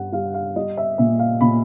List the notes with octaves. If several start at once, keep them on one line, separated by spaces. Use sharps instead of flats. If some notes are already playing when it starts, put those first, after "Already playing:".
Already playing: G2 G3 F#5
G3 F5
F5
G3 D#5
E5
A#2 E5
F5
A#2 B5